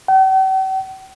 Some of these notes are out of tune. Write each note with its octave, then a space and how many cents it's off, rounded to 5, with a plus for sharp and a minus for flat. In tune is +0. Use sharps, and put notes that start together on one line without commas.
G5 -45